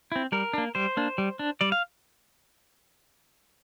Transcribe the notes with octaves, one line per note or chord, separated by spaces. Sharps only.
C4 E4
G3 A#4
A#3 D4
G3 C5
A#3 D4
G3
D4
G3 D5
F5